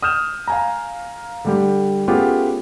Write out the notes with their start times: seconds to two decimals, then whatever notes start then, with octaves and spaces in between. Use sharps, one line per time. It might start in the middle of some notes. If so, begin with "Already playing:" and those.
0.03 D#6 F6 G6 E7
0.48 F5 G#5 A#5
1.45 D3 G3 G4
2.08 A3 B3 C#4 F4 G4 G#4